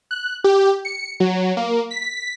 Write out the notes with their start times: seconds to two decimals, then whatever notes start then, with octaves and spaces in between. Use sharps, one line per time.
0.11 F#6
0.44 G4
0.85 C#7
1.20 F#3
1.57 A#3
1.91 B6